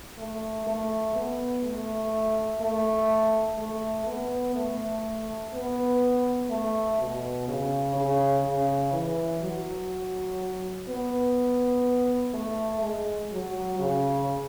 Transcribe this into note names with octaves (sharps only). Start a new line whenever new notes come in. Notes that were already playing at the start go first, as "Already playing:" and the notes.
A3
A3
B3
A3
A3
A3
B3
A3
B3
A3
B2
C#3
C#3
C#3
E3
F#3
B3
A3
G#3
F#3
C#3